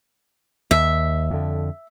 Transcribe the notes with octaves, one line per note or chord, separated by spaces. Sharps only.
D#2 E5
F2 D3